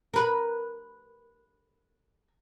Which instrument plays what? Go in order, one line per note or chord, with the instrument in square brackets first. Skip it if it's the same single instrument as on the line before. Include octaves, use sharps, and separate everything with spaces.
[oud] A#4 B4